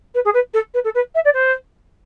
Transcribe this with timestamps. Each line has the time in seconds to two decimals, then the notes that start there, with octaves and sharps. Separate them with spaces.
0.14 B4
0.24 G#4
0.33 B4
0.53 A4
0.74 B4
0.84 A4
0.94 B4
1.14 E5
1.24 D5
1.33 C5